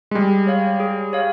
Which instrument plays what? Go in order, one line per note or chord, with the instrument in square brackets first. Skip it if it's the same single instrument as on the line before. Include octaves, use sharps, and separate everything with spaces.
[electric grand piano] G#3
[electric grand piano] G3 [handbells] G#4
[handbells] C#5 F5
G#4
C#5 F5